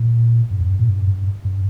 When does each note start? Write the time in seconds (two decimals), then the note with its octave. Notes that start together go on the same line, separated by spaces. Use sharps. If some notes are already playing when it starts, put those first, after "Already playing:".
Already playing: A#2
0.51 G2
0.61 F2
0.70 G2
0.79 A#2
0.89 G2
1.07 G2
1.45 G2